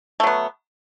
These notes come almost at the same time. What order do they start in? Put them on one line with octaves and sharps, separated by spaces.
A3 F#3 B3